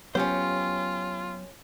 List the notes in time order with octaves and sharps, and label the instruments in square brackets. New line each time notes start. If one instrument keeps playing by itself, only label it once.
[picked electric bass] F#3 B3 [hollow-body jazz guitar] C#4 G4 C5 [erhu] F4